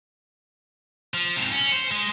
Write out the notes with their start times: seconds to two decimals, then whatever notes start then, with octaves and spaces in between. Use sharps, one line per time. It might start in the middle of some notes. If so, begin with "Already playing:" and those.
1.14 F3
1.36 G#2 C3
1.52 C#4
1.72 C5
1.91 G#3